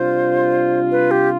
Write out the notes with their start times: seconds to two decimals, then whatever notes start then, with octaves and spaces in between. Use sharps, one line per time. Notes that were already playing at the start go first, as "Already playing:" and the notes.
Already playing: C3 G3 D4 F4 C5
0.92 B4
1.11 G4